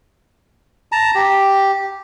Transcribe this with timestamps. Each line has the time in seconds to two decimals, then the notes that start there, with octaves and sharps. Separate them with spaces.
0.92 A5 A#5
1.15 G4